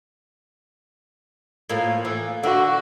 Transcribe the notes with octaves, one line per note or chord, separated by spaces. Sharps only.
A2 F3 A#3
E3
D3 F#4